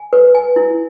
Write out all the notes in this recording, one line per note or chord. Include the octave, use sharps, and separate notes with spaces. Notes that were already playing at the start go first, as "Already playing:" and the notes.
Already playing: G#5
B4
G#5
E4